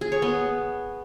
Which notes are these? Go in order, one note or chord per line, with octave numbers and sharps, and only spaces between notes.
G#4
C#5
B3